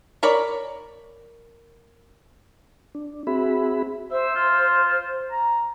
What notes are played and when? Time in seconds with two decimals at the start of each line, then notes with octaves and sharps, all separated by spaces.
0.23 A#4 C#5 D5 B5
2.95 D4
3.27 C4 F#4 G#4 E5 B5
4.11 C5 E5
4.35 F4
5.31 A#5